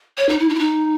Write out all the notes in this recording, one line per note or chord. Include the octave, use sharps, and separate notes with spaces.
C#5
D#4
E4
D#4
E4
D#4